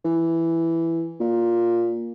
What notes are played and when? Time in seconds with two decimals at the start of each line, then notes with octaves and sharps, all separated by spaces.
0.05 E3
1.20 A#2